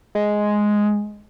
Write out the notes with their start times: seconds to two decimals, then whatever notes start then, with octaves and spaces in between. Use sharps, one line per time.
0.15 G#3